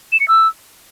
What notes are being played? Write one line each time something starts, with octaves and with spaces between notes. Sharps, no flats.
E7
C#7
E6